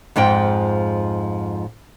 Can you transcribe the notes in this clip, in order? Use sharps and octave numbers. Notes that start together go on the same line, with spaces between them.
F2 G#2 F3 G5